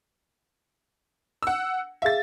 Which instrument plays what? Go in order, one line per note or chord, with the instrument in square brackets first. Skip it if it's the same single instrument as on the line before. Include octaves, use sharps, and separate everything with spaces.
[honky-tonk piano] F#5 E6
[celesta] G#4 F5 [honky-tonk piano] E5 A6